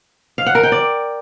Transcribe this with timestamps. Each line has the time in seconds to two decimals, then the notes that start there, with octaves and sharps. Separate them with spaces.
0.38 F5
0.46 F#5
0.55 A#4
0.63 G5
0.72 D5